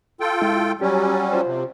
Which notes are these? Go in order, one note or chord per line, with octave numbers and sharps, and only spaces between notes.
F4 A4 G5
G#3 E4
F#3 G3 C#4 G4
F4 C5
C3